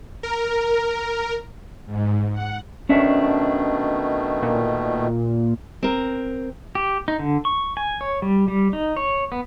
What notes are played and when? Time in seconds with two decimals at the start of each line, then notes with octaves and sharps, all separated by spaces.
0.23 A#4
1.86 G#2
2.32 F#5
2.89 B2 D#3 A3 C#4 D4 E5
4.43 A#2
5.83 C4 A#4
6.75 G4
7.08 D#4
7.19 D3
7.45 C#6
7.77 G#5
8.01 C#5
8.22 G3
8.48 G3
8.73 D#4
8.97 C#5
9.32 B3